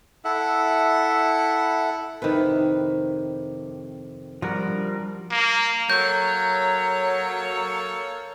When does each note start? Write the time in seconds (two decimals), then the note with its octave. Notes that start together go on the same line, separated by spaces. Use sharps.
0.25 E4 A4 E5 F#5
2.22 F2 C3 D#3 E4 B4
4.42 F3 G3 F#4 A#4
4.67 D4
5.31 A#3
5.90 F#3 A#3 A4 C#5 G6